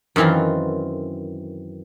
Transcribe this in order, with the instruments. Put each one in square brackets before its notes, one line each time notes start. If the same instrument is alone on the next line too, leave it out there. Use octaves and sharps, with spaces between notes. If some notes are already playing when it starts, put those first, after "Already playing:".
[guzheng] F#2 D#3 E3 C4 F4